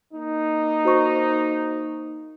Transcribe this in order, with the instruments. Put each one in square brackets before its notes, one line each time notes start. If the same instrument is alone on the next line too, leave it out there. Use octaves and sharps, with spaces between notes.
[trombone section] A#3 D#4
[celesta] F#4 C5 C#6